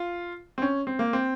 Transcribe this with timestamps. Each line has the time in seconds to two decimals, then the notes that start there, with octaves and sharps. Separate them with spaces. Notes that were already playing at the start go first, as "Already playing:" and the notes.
Already playing: F4
0.58 C4
0.62 C#4
0.87 C4
0.99 A#3
1.13 C4